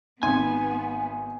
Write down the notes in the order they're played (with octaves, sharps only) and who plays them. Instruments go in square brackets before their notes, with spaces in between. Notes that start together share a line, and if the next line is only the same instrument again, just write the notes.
[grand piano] G#1 C3 C6 [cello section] B3 [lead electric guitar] G#5